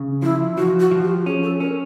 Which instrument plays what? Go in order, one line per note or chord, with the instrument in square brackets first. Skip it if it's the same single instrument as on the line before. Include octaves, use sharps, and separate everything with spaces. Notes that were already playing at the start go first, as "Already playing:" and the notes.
Already playing: [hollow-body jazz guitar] C#3
[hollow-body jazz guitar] F3 [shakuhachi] E4
[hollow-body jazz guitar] F3 [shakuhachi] F#4
[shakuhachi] F#4
[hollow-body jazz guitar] F3
[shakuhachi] G4
[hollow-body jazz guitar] C#4 [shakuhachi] G#4
[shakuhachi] A4
[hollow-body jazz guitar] C#4 [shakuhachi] A#4